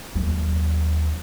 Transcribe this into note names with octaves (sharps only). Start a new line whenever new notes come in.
D#2 F#3